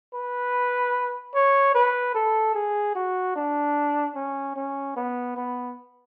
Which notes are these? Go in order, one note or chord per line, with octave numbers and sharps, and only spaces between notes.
B4
C#5
B4
A4
G#4
F#4
D4
C#4
C#4
B3
B3